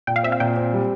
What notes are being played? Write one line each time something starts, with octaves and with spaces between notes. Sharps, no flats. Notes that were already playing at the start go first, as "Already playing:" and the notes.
A#2 G5
F5
C4 E5
F5
A#2 G5
C4
G3